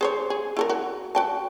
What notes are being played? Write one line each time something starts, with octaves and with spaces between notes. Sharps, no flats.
G#4 C5 C#5
G#4
E4 A4 A#4
F#4
F#4 G5 A5